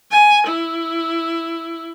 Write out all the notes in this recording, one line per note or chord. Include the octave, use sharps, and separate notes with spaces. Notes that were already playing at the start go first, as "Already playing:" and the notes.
G#5
E4